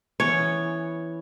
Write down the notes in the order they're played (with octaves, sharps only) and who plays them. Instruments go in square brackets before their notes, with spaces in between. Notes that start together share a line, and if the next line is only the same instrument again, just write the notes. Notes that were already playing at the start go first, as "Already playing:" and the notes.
[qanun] E3 B3 C#4 [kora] C#5